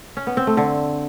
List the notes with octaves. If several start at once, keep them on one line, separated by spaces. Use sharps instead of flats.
C#4
B3
C4
A3
D3